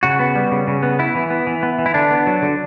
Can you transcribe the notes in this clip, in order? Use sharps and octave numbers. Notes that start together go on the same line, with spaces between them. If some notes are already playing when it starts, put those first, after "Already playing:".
C#3 F#4
B3
G3
C#3
C#3
B3
B3 E4
E3
B3
E3
B3
E3
E4
D3 D4
B3
F#3
D3